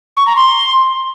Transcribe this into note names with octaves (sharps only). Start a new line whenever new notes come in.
C#6
A#5
C6